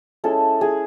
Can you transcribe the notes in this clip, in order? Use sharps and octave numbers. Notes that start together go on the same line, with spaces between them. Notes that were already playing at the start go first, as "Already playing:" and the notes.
G#3 C#4 E4 A4
G#4